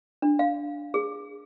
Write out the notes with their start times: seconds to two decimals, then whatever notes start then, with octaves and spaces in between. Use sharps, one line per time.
0.22 D4
0.39 F5
0.94 G#4